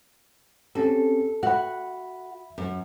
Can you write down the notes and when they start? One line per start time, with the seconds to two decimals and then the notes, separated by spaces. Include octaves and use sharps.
0.75 C4 C#4 G4 A4
1.43 F#4 E5 F#5 B5
2.58 F#2